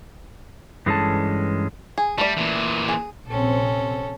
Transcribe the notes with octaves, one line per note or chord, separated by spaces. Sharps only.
G2 E3 G#3 C#4 A4 A5
G#4
G3 A3 D5
A#2 E3
G#4
A#1 C3 C4 C#4 A4